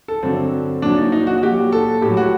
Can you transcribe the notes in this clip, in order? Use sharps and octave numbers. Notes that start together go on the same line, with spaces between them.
A4
G2 D3 F#3 C4
A#2 F#3 D4
D#4
D#4
F#4
F#4
A#2 F#3 G4
A4
A2 F#3 G4
F#4